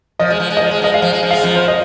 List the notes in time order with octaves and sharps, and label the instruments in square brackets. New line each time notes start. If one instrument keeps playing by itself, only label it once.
[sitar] F3 [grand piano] D#5
[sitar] G#3
F3
G#3
[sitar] F3 [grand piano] D#5
[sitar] G#3
[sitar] F3 [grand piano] D#5
[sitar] G#3 [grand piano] F5
[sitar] F3
G#3
F3
[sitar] G#3 [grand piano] F5
[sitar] F2 F3
[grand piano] C5
D#5